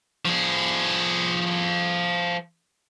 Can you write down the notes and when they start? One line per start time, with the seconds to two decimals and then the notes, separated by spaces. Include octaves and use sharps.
0.25 F3 G#4